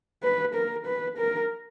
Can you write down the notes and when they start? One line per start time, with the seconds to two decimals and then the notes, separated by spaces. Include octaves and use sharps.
0.23 B4
0.55 A#4
0.86 B4
1.17 A#4